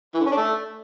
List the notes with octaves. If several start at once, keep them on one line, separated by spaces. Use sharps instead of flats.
E3
D3
C#4
D4
A3